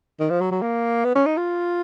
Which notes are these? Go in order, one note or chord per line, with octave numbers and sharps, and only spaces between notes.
D#3
F3
F#3
F#3
A#3
B3
C#4
D#4
F4